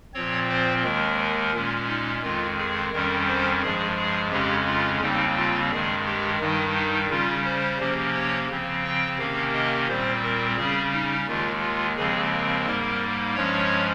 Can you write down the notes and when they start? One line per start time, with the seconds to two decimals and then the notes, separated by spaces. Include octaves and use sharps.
0.14 A#2 F3 C4 C#5
0.49 C5
0.84 D#2 D#3 G#3 A#4
1.53 A#2 G#3 C#4
1.88 D#4
2.22 F2 D#3 G#3 F4
2.58 G#4
2.93 F2 D#3 G3 C#4 A#4
3.27 C5
3.62 G2 F3 G#3 G#4
3.97 G#4
4.31 F2 C#3 G#3 C#4 G4
4.66 F4
5.01 D#2 C#3 G3 C4 D#4
5.36 F4
5.71 G2 D#3 G#3 G#4
6.05 G4
6.40 G2 D#3 G3 D#4
6.76 D#4
7.09 C#3 G3 C#4 F4
7.45 C5
7.79 C3 F3 A#3 C#4
8.14 C#5
8.49 C#3 F3 C4
8.84 G5
9.18 C3 D#3 A#3 C#4 F5
9.53 D#5
9.87 A#2 G3 C4 C5
10.22 A#4
10.57 C#3 G3 C#4 G#4
10.93 D#4
11.27 D#2 D#3 G#3 F4
11.62 F4
11.96 D#2 C#3 F3 G#3 C4 G#4
12.32 A#4
12.66 G#2 G3 A#3
13.35 G2 F3 G#3 C#4 C#5